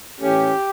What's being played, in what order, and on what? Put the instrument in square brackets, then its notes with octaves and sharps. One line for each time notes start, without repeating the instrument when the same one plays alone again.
[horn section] A2 E3 A3 C#4 G4